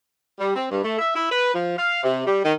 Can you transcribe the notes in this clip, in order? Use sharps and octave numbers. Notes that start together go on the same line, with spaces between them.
G3
C4
G2
A3
E5
E4
B4
F3
F5
C3
G3
D#3